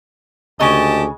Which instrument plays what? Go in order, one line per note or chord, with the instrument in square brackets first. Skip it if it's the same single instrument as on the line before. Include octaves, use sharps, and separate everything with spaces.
[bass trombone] D2 [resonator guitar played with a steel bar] C#3 G#3 [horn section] G4 D#5 A5